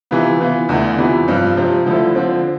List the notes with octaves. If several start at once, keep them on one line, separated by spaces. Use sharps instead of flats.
C3 E3 B3 F4
E3 B3 F4
E2 D3 A3
F2 C3 E3 B3
G2 F3 C4
C3 F3 C4
D3 F3 A3 E4 A4
D3 F3 C4